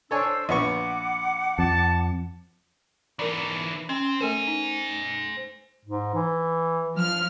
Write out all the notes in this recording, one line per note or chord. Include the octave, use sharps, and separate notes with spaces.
D4 A4 C5 C#5 G#5 E6
A#1 B3 F#5 C#6 D6
F2 A5
E3 D#4 A#4 D5
C4 C#4
A3 A4 A#4 C5 G#5
D#4
G#2
E3
F3 F6